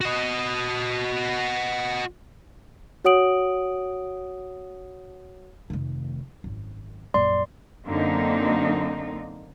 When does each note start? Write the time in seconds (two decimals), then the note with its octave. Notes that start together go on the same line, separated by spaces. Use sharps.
0.01 F#4 D#5
3.05 F#4 C#5 F#5 D#6 D7 F#7
5.70 F1 D#3
6.44 G#1 F#2
7.14 A#1 F#2 D5 C6
7.86 F#2 D3 A#3 C4 D#4